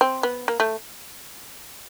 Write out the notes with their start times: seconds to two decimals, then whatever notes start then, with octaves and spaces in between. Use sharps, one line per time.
0.01 C4
0.23 B3
0.48 A#3
0.60 A3